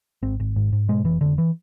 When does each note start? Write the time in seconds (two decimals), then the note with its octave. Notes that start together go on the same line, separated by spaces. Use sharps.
0.23 G#1 C4
0.40 G#1
0.56 G#2
0.73 G#2
0.88 B2 G#3
1.04 F1 E3
1.21 F1 D3
1.38 E3